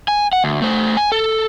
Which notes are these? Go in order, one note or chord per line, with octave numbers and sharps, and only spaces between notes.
G#5
F#5
D2
A3 C5
G#5
A4